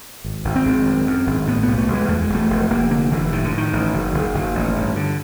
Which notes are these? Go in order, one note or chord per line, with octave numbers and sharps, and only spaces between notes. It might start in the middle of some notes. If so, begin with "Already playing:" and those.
G#1
G#1
C4
G#1
F#2
F#2
G#1
A2 B3
B1 B3
A3
B1
G#3
E2 A3
G#3
E1
A3
E1
F1 A#3
D3 A#3
F1 E3
A2 D#3
D3
A2
D#3
A1
F#1
F#1
F#1
A1
G2
D3